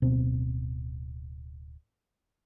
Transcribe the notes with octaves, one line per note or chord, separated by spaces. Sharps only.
D1 B2 C4